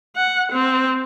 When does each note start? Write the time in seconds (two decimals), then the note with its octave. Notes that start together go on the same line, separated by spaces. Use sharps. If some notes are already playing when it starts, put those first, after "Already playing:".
0.16 F#5
0.52 C4